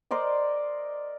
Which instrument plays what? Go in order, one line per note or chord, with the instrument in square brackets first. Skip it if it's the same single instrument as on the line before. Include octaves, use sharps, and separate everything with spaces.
[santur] A#4 C5 D5 D#5